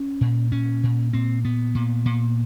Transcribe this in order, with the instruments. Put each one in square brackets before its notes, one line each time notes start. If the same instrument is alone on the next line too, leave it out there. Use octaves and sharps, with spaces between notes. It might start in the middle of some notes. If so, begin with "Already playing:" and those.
Already playing: [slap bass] C#4
A#2
A#2 C#4
A#2
A#2 C4
A#2 B3
A#2
A#2